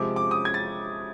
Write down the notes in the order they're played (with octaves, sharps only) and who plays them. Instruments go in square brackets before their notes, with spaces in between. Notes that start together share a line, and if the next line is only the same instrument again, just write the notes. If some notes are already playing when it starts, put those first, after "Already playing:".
Already playing: [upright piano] C3 F3 G#3 D6
D6
D#6
G#6
A6